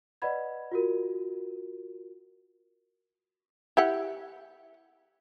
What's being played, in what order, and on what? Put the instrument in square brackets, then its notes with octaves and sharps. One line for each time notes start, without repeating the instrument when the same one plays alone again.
[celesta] B4 D5 D#5 F#5 B5 G#6
F4 F#4 A#4
[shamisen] E4 G4 F#5